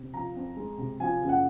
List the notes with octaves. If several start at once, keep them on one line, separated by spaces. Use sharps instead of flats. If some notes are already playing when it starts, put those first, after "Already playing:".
Already playing: C3
F3 A#5
F2
G#3
C3
F3 G#5
F#1
F#5